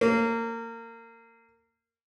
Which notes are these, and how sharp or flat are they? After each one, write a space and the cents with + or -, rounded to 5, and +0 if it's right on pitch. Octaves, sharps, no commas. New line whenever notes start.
A#3 -25